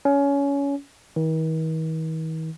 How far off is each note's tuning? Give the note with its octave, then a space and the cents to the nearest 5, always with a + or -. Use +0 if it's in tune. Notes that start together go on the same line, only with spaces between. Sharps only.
C#4 +20
D#3 +45